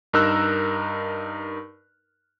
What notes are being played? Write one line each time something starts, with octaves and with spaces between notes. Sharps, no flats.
G2 D#4 A#4 E6 F#6